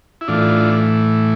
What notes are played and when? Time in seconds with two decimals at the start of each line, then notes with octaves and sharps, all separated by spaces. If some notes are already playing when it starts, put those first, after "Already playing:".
0.21 E4
0.28 A2 E3 D4 F4